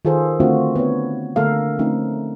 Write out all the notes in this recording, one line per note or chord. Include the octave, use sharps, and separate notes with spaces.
D#3 F4 G#4 A4 C5
D3 A3 C4 D4 F4 F#4
B3 C4 C#5
D3 A3 A#3 A4 A#4 F5
F3 A3 C4 C#4 D#4